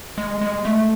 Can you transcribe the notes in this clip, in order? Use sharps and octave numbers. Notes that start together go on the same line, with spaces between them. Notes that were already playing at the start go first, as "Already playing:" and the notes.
G#3
G#3
A3